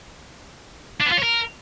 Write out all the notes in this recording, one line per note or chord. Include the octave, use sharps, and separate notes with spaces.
D4
B3
F4
C#5
A#4